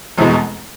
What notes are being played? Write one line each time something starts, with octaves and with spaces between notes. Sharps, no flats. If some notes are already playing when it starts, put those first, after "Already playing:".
F1 E2 B2 G#3 B3